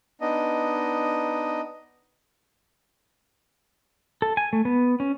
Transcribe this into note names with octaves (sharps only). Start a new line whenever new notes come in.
B3 D4 D#4 D#5
A4
G#5
A3
B3
C#4